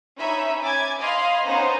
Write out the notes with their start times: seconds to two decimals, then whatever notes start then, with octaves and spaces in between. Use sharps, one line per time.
0.18 C#4 D#4 C#5 E5 B5
0.64 G#5 D6 G#6 A6
1.00 D#5 F5 B5 C6
1.44 B3 C#4 D#4 C5 A#5